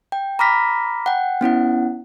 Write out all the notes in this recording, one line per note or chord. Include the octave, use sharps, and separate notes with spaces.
G5
A#5 B5 D6 F6 A#6 B6
F#5 G5
B3 C#4 E4 F#5